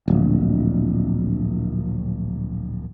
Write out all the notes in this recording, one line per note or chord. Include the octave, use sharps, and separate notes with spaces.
D1 A#1